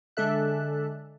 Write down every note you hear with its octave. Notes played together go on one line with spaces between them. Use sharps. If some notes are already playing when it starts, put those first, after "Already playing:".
D3 G#3 D4 A4 E5 F#6